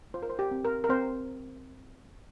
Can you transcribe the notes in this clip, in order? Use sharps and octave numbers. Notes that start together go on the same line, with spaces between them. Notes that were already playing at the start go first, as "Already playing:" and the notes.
F4 C5
A#4
C5
G4
C4
A#4
A#4
C4 C5